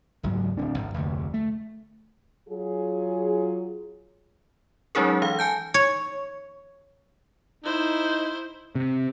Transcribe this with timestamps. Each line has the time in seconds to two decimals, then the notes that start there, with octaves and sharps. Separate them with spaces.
0.23 F#1 C#2 G#2 F#3
0.57 D1 C4 D4
0.78 G#1
0.94 F1 D2
1.34 A3
2.48 F#3 F4 G#4
4.95 F#3 G#3 C#4 D#4 G#4 A#4
5.22 E3 F5
5.39 G#5 A5 G6
5.74 C#5
7.64 D#4 E4 C5
8.75 C3